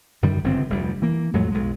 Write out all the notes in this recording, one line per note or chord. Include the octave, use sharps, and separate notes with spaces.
F#2 D3 D#3 G3
G1 F#2 C#3 C4
F1 D2 G3
E3 A#3
F2 A2 F#3 G#3
B1 G#3